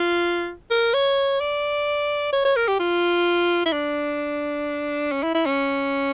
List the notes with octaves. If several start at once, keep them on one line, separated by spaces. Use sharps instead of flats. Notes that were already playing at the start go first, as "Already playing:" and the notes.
Already playing: F4
A#4
C#5
D5
C#5
C#5
A#4
G4
F4
E4
D4
C#4
E4
E4
C#4